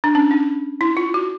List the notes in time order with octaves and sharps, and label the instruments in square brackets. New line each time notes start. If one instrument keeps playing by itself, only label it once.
[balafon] D4
C#4
D#4
E4
F4
F#4